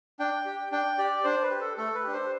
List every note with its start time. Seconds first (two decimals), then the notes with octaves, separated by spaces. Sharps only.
0.20 D4 G5
0.46 G4
0.72 D4 G5
0.98 G4 D5
1.24 D4 C5
1.43 B4
1.51 G4
1.60 A4
1.77 A3 A4
1.95 B4
2.03 D4 G4
2.13 C5